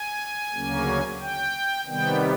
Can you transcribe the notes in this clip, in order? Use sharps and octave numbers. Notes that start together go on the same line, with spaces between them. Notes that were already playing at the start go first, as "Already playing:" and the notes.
Already playing: G#5
D2 C#3 F#3 A#3 C#4
G5
C3 D#3 G3 B3 G5